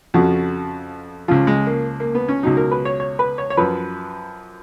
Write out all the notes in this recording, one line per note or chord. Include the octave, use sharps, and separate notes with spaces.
F2 C#3 F3 F#4
C#2 C#3 F3 F4
G#3
A#3
A#3
B3
C#4
C#2 B2 F#3 D#4
A#4
B4
C#5
C#5
B4
C#5
C#5
F#2 F3 B4